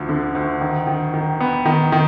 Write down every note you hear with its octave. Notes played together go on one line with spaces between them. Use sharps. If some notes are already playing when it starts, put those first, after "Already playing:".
Already playing: D2 F3
D3
D2
D#3
D#3
D#3
B3
D#3
D#3